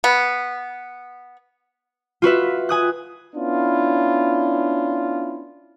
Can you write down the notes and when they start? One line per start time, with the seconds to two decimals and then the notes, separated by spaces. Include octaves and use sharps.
0.04 B3
2.22 F4 F#4 B4 E5
2.69 G#5 D#6 F#6
3.35 B3 C#4 D4 E4 F4